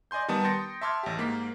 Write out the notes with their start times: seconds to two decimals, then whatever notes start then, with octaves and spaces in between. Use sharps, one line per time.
0.11 D5 D#5 G#5 C6 G6
0.28 D#3 G3 B3 A5 D#6
0.44 G5 C6 D#6 A6 A#6 C#7
0.81 E5 A5 C6 D6 F6 G#6
1.03 A1 G4
1.17 G#2 A#3 B6